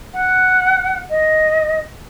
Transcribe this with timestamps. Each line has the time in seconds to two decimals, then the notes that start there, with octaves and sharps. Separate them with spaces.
0.14 F#5
1.10 D#5